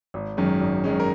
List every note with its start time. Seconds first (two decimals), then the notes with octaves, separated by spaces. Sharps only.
0.14 G#1
0.37 F#2 D#3 G#3 C#4
0.61 G#1
0.84 F#2 D#3 G#3 C#4
1.00 A#4